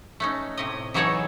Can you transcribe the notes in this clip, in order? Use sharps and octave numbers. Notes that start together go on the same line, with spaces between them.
A3 C#4 D#4
A2 C3 D#5
E3 F#3 D#4 G#4 A4 C#5